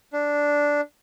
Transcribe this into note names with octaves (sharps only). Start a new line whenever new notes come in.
D4